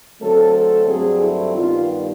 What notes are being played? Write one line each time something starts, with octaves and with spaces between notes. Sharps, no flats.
D3 F#3 A3 C4 A4
A4
G2 D3 F#3 A3 C4 G#4
E4
G2 D#3 G3 B3 F4